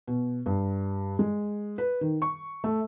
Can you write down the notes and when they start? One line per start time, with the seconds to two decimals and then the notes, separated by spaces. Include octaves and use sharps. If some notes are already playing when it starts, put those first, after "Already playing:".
0.07 B2
0.46 G2
1.19 G#3
1.78 B4
2.01 D#3
2.22 C#6
2.64 A3